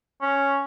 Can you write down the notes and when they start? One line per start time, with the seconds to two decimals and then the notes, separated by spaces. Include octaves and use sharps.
0.22 C#4